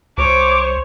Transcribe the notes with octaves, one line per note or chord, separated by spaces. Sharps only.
C2 C5 C#5 D6